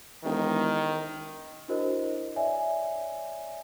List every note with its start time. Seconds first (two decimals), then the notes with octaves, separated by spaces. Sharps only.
0.25 E1 D#3
1.68 D4 E4 F#4 A#4 C5 D#5
2.36 C#5 D5 E5 G#5